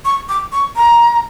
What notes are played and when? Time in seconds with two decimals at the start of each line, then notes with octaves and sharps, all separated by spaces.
0.05 C#6
0.29 D6
0.52 C#6
0.76 A#5